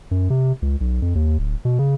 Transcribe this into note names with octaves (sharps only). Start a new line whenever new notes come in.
F#2
C3
C#2
B1
F2
D#2
D1
B2
C#3